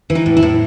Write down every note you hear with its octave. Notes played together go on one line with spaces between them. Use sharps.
E3
D#4
A2
E4
A2